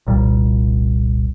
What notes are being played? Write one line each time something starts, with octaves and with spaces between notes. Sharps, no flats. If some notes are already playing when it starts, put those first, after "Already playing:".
F1 C2 A#2 G3